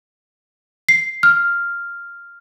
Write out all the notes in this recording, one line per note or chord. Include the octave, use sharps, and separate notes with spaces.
C7
F6